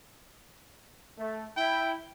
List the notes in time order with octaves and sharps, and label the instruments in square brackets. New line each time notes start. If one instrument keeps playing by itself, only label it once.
[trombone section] A3
[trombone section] E4 [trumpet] G5